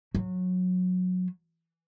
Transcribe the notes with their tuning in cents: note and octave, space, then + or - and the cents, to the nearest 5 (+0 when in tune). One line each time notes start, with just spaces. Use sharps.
F#3 -20